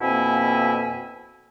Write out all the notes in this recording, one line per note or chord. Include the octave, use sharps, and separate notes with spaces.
F2 B2 A#3 C4 E4 G#5